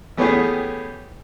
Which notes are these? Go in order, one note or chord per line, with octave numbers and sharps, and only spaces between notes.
E3 A3 B3 C#4 G4 G#4